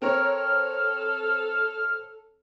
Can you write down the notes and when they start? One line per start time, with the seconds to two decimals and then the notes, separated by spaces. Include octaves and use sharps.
0.02 C4 A4 A#4 C#5 F6